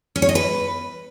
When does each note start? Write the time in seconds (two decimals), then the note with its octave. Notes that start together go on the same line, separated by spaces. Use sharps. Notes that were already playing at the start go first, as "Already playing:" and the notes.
0.16 C#4
0.22 C#5
0.29 D#5
0.35 B4